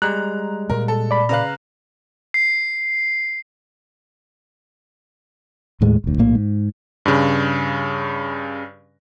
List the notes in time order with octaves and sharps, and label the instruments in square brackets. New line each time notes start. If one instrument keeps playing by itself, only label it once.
[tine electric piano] G3 G#3 [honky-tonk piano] A#5 [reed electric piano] F#6
[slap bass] A#2 A#3 [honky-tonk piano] A#4
[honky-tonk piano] A4
[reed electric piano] D5 B5
[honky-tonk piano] C#3 B4 F5 [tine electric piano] A#5 F#6
[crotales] C7
[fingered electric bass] D#2 A2 G#3
E1 D2
A#1 A2 A#3
G#2
[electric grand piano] G2 C#3